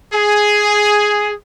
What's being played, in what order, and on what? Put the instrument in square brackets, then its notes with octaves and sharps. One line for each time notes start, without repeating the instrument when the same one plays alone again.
[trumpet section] G#4